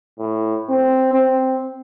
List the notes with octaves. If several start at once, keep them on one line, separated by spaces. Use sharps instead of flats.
A2
C4
C4